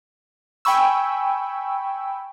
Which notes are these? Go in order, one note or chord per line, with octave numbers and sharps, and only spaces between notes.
G5 G#5 B5 C#6 E6